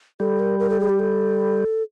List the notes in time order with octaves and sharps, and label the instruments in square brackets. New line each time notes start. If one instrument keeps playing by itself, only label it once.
[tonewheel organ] G3 [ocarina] A4
[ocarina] A#4
A#4
A4
G#4
G4
A4